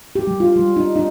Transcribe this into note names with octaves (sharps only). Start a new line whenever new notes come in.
G4
G3
F4
G3
D#4
D#4